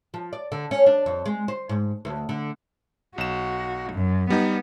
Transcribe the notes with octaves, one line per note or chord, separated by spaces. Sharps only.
F3
D5
D3
C#4
D4
F2
G#3
C5
G#2
D2
D3
B1 F#4 E7
F#2
G3 B3 D#4